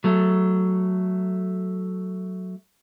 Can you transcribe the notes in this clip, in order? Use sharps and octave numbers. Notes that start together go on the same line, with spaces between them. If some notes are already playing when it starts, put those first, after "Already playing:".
F#3 A3